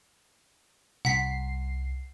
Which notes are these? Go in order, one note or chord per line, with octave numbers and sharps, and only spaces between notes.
C2 F#5 B6 C7